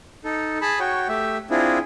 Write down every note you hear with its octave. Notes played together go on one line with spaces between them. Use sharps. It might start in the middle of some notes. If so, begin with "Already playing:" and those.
D#4 A4
G#4 A5 B5
F#4 C#5 G5
A3 G4 E5
C4 D4 E4 F4 G#4